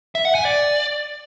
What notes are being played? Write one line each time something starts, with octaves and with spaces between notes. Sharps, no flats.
E5
F#5
G#5
D5